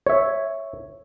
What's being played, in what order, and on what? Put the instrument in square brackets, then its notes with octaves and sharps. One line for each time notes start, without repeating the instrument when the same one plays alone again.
[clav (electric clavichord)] C#5 E5